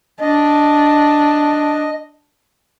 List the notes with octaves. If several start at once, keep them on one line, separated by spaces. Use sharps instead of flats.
D4 D#5